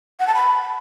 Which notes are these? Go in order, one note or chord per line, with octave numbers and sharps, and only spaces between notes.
F#5
A5
B5